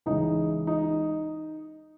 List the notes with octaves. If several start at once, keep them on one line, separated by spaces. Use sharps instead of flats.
C#2 C#3 E3 D#4
D#4